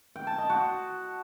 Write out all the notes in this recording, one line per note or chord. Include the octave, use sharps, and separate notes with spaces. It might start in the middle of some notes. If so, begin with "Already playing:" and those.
G5
A5
D#5
F#4